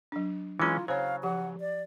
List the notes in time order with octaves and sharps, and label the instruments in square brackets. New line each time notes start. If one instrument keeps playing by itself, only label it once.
[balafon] F#3 D4
[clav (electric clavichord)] E3 G#3 C#4 [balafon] E4 A#5 [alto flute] F4
[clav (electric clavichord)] C#3 F#3 [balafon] C5 C#5 [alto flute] F5
[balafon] F3 G4 [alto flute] F#5
[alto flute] D5